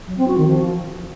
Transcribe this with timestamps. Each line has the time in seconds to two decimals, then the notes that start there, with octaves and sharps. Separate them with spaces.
0.08 F#3
0.18 C4
0.28 F#4
0.38 D#3
0.48 F3